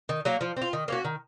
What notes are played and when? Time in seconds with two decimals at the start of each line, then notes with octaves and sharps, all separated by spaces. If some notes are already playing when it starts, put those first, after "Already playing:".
0.09 D#3
0.25 F#3 A#3
0.41 F3
0.57 C4 F4
0.73 D#3
0.88 A#3 C#4 F#4
1.05 D#3